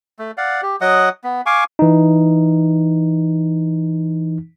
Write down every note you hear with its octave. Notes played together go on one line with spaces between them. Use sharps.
A3
D5 F5 F#5
G4
F#3 D#5 F#5 D#6
B3
F5 G#5 C#6 D6
E3 D#4